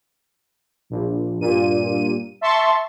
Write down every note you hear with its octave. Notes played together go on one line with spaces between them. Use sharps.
A#1
G2 A#2 D#7
E5 A5 C6 C#6